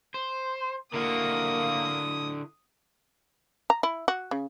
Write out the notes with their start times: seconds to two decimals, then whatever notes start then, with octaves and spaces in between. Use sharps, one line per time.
0.14 C5
0.94 D3 A#3 E4 F#4 D#6
3.70 A#5
3.83 E4
4.08 F#4
4.31 C#3